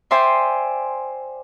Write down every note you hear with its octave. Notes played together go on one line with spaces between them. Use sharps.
C5 D5 E5 G5 G#5 C6